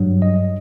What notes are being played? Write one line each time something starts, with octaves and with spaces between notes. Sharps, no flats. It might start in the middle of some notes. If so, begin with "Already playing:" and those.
Already playing: G2 F#3
D#5